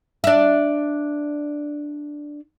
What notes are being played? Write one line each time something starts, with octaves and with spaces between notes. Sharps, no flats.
D4 E5